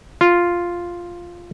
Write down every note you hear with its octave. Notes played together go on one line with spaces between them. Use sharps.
F4